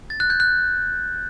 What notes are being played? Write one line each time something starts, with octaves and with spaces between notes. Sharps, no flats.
A6
F#6
G6
F#6